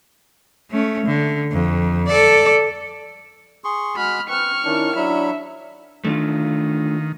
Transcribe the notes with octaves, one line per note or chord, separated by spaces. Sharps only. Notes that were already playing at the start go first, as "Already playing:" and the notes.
A3 C#4
D3
F2
A4 D5
G#4 C6 C#6
G#3 F#4 B5 F6
C4 B4 C#6 F6
D#3 C#4 D4 E4
F#3 D4 E4 D5 E5 B5
D#3 A3 D4 F4